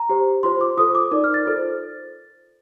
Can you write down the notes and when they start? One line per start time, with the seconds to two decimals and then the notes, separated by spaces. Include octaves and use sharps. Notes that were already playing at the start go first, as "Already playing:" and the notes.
Already playing: A#5
0.09 G4 C5
0.43 F4 C5 C6
0.61 D6
0.77 F4 A4 C5 D#6
0.95 D6
1.11 D#4 A#4 D5 D6
1.24 F6
1.34 A6
1.45 F4 A4 C5